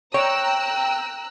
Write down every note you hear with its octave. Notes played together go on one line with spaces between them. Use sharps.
C#5 G5 A#5 E6 F#6